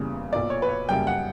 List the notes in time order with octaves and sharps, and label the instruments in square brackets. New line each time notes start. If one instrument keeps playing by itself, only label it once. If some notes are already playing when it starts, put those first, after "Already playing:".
Already playing: [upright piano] F#1 E2 C#3 G3
B1 A#2 A#3 D5
C#5
B4
C#5
F#2 C#3 G3 A#3 G5
F#5